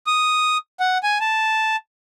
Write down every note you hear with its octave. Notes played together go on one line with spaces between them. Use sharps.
D#6
F#5
G#5
A5